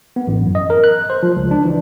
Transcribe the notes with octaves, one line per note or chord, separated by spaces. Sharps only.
B3
A1
F#2
D#5
A#4
F#6
C5
F3
C#2
D4
E3